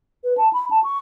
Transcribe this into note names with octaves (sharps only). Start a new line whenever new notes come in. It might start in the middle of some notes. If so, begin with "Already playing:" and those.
B4
A5
B5
A5
C#6